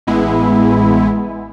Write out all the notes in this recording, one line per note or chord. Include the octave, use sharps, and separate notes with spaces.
A1 G#3 B3 E4